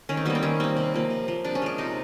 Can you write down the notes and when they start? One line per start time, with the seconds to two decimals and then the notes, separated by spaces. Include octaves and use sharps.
0.09 D#3 C#4
0.17 C4
0.26 G3 A#3 B3
0.35 C4
0.43 D#3 C#4
0.60 G3 A#3 C4
0.77 C3
0.94 F3 A#3
1.10 C3
1.28 F3 A#3
1.45 C3 D4
1.55 C#4
1.62 F3 G#3 D4
1.78 C3 D#4